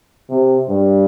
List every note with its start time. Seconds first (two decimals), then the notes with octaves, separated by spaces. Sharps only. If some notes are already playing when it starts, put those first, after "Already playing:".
0.30 C3
0.68 G2